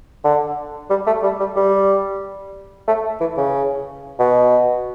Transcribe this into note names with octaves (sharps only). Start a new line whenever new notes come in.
D3
G3
A3
G3
G3
G3
A3
E3
C#3
B2